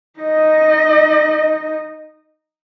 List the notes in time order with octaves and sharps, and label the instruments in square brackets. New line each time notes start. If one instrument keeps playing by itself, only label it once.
[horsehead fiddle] D#4 D#5